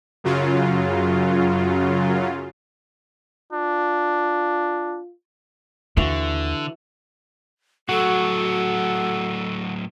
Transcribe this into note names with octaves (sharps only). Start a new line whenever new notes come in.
F#2 C#3 F#3 F4
D4 F4
D#2 D3 E3 F4 F#4
A2 F#3 F#4 A4